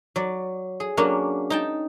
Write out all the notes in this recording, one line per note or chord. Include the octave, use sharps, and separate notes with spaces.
F#3 D5
G#4
F#3 A#3 C#4 D4
D#4 G5 A5